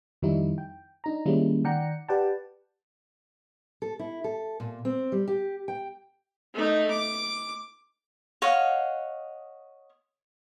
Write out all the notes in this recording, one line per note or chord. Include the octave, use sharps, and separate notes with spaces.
F2 D#3 F3 G3 D#4 E4
G5
D4 D#4 A#5
D#3 G3 G#3 A#3 C#4 E4
D#3 D5 F#5 G5 A#5 C#7
G4 B4 D5 F#5 G5 A5
A4
E4
A4
A#2
C4
G3
G4
G5
A3 D#4
D6
C#5 D#5 F5 F#5